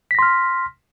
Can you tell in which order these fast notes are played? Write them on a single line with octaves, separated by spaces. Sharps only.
B6 A#6 C6 F6